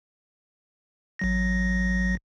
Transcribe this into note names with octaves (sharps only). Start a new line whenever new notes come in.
A1 F#3 A#6